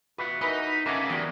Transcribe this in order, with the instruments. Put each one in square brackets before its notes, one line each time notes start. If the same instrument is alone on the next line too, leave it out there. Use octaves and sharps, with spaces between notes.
[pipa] F4 B4 [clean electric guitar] F#4 E5 F#5
[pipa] E3 A#4 B4 [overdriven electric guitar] D#4 [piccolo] B6
[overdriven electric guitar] C#3 [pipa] E3 A3 F#5 [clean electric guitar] A#4 B4 G#5 [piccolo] D6
[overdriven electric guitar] E2 [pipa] F#4 G4 D5